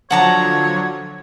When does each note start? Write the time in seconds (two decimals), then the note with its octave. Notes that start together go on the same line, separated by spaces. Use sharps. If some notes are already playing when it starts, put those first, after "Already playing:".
0.10 D3 F3 F#3 C#5 F#5 A5 A#5